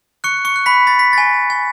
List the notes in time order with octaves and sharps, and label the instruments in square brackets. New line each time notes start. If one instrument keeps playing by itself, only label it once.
[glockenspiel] C#6 F#6 C#7
C#6 C#7
F#6
B5 B6
B5 A6
B6
G#5 A6
G#5